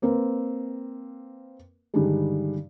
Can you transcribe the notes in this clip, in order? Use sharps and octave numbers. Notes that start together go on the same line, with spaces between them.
A#3 C4 A#4 B4
G2 D3 D#3 G3 G#3